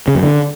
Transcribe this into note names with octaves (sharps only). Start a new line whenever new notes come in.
C#3
F#2
D3